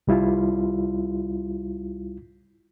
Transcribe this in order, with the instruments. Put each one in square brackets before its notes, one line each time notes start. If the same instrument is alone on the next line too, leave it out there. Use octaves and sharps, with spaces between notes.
[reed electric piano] C2 G3 E4 F4